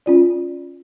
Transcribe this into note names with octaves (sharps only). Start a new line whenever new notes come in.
C#4 F4 D5